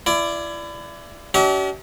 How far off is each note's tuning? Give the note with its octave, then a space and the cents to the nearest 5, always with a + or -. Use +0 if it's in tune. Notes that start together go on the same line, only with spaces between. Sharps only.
E4 +30 D5 +0
D4 -45 G4 -45 E5 -45